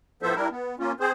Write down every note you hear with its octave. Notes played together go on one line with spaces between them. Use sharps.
A2 F3 B3 A4 C5 E5
G3 D4 E4 A#4
B3
A#3 C#4 F4
C4 G#4 C5